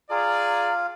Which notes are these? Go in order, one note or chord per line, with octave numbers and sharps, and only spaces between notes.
F4 G#4 D5 A#5